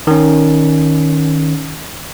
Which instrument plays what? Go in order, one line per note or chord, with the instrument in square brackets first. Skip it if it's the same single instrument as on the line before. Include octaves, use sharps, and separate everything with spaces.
[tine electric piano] D#3 C#4